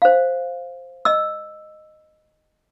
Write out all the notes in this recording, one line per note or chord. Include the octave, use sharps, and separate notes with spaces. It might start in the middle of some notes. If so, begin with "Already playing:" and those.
C5 F5
D#5 E6